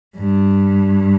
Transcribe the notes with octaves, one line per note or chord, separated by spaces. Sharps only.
G2